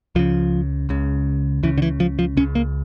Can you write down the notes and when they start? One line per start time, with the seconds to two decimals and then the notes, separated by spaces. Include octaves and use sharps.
0.15 C#2 C#3 F3
0.89 C#2 C#3
1.63 C#2 C#3 E3
1.78 D3
1.82 E3
2.00 F3
2.19 F3
2.37 C#2 C#4
2.40 C#3
2.55 A#3